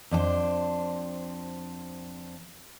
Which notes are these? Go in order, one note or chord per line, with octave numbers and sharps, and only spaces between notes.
F2 D4 G#4 C5